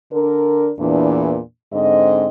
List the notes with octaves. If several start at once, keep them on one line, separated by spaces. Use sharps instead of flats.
D3 D4 A#4
E2 A#2 E3 D4
G#2 D3 C4 D#5